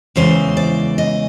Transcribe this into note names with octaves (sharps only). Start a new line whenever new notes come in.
E2 C#3 E3 G#3 C5
D5
D#5